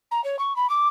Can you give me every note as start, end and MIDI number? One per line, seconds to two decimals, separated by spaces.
0.11 0.23 82
0.24 0.38 73
0.39 0.55 85
0.56 0.69 83
0.69 0.88 86